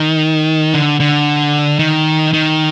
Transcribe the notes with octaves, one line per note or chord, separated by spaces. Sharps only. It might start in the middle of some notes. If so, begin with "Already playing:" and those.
Already playing: D#3
D3
D3
D#3
D#3